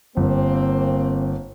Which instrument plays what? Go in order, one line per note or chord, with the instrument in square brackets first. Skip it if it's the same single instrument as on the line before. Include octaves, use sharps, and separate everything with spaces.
[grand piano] G1 [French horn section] A#3 C4